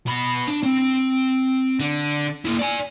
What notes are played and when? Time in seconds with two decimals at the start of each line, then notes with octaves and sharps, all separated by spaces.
0.06 B2 B5
0.48 D4
0.63 C4
1.80 D3
2.45 A#3 E4
2.59 D5 G#5